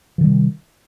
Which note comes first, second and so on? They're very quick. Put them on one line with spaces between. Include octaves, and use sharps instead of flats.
E3 D#3 G3 C3